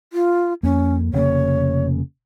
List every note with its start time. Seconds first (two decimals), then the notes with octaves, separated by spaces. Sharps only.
0.13 F4
0.63 F2 A#3 C#4
1.13 F1 C#3 A#3 C#5